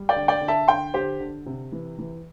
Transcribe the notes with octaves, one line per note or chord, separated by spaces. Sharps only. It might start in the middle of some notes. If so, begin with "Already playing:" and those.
Already playing: G3
D5 G5
D3
D5 G5
D3
E5 A5
D3 G5 C6
D3 G4 C5
D3
C3
E3
E3